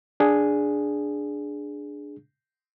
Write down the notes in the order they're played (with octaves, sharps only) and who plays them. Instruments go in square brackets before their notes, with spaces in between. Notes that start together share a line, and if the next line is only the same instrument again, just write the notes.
[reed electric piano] D4 G#4